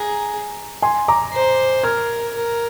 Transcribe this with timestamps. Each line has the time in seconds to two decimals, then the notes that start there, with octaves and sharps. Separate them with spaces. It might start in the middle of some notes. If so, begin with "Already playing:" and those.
Already playing: G#4 A#5
0.82 G#5 C6
1.08 A#5 D6
1.33 C5
1.84 A#4 F6 G#6
2.35 A#4